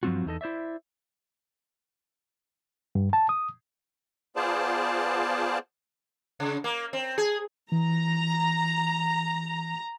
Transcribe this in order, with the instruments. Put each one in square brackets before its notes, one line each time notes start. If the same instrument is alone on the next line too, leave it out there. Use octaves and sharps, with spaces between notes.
[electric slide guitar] G2 F3 F#3 C4 F4 F#4
E2 D#4 A4 D#5
E4 C5 D5 E5
[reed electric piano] G2
A5
D#6
[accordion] B3 F4 G#4 C5 D5 A5
[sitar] C#3
A#3
C4
G#4
[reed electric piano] E3 [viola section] A#5